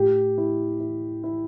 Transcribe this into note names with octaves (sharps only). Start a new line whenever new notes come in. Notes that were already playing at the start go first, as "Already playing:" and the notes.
Already playing: A2 G4
E4
E4
E4